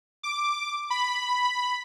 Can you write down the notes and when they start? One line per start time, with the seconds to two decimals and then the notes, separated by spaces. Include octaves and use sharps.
0.23 D6
0.90 B5